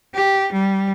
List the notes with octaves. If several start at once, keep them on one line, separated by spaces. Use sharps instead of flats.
G4
G3